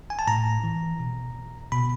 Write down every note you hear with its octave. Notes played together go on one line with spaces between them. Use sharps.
G#5
A5
A2 A#5
E3
B2
B2 B5